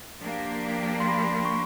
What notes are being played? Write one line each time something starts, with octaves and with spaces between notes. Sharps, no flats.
F3 A#3 D4 G4
C6
B5
C#6